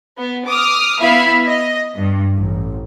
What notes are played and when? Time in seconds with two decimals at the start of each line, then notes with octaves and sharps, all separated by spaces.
0.18 B3
0.48 D6 D#6 F6
1.00 B3 E4 E5 F5 B5
1.46 D#5
1.95 G2
2.36 A1